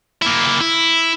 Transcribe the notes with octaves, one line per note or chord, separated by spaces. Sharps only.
A#3 E4
E4